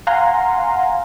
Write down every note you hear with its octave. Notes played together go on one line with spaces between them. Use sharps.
F5 F#5 G#5 A#5 C6